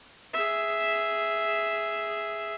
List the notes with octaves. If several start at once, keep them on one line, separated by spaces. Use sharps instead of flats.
G#4 E5